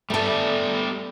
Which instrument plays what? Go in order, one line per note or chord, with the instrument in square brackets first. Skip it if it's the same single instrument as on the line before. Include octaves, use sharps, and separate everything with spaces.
[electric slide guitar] G3 B3 D5 [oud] A3 A4